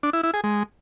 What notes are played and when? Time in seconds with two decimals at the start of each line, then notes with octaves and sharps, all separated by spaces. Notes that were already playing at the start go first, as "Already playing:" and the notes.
0.03 D4
0.13 E4
0.23 E4
0.34 G#4
0.44 G#3